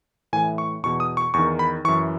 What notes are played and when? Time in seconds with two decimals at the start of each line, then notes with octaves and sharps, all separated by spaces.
0.33 A2 E3 G#5
0.58 C#6
0.83 E2 B2 C#6
1.00 D#6
1.17 C#6
1.34 E2 D#3 C#6
1.59 B5
1.84 E3 C#6
1.88 F#2